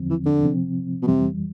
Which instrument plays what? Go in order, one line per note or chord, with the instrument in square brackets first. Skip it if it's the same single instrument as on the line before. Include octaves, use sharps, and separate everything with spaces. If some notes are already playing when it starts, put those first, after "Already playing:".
Already playing: [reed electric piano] E2 D3 F3 C4
[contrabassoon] E3
D3
[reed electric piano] C3 F3 C4
[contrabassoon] B2
[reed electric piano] F2 E3 G3 [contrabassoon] C3